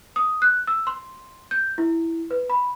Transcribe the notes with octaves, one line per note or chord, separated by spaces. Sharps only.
D#6
F#6
E6
C6
G6
E4
B4
B5